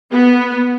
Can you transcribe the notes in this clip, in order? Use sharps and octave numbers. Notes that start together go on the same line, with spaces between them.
B3